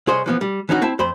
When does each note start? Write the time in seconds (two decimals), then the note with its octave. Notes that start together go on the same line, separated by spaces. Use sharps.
0.07 C2 G#4 C5 C#5 D#5
0.26 E3 F3 B3
0.41 G3
0.69 E3 C#4 D#4 F#4
0.82 C4 E4 A5
0.99 F2 C5 B5